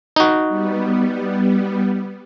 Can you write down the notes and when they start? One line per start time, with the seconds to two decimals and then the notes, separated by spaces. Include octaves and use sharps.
0.16 D#4 F#4
0.49 G3 B3